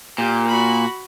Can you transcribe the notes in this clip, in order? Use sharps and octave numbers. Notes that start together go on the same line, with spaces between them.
A#2 G4
F#4 B5